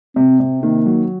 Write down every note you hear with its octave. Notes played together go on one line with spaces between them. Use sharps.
C3 C4
C3
D#3 A#3
F#3